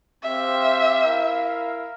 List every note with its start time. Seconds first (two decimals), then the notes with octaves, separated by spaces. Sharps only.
0.23 C4 G4 C5 E5 F5
1.04 E4 A#4 F5